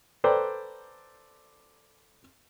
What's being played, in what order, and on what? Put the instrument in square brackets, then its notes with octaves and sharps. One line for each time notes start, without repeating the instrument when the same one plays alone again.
[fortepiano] A4 B4 C5 D5 G5 A#5